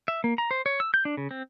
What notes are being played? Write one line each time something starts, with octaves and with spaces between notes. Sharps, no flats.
E5
A#3
A#5
C5
C#5
E6
G6
D4
C#3
C4